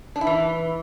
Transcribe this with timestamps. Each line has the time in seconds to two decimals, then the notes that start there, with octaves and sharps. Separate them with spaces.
0.16 D4
0.21 E4
0.27 E3